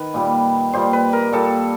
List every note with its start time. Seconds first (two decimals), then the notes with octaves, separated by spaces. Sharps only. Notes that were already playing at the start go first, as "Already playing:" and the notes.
Already playing: D#3 B4
0.14 A#2 G3
0.73 A#2 G3 C5
0.93 B4
1.13 A#4
1.32 A#2 G3 A4